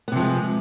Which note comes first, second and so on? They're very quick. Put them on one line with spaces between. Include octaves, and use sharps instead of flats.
B3 C3 F3 G#3